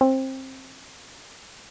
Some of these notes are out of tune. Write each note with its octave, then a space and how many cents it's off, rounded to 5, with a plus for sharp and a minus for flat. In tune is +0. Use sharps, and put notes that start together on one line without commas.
C4 +20